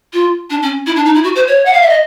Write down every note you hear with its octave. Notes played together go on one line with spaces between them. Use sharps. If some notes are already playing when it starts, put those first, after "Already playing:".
F4
D4
C#4
E4
D4
D#4
E4
F#4
C5
C#5
F#5
F5
E5
D#5